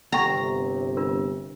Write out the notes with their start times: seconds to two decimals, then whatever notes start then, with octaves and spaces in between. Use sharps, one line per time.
0.12 G1 C3 F#5 G5 A#5 C#6
0.97 D4 F4 A#4